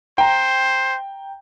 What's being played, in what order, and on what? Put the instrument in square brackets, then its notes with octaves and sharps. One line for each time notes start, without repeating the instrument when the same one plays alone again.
[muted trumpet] C5 [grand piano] G5 A#5